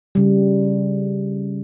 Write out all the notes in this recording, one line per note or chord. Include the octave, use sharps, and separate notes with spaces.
C#3 G3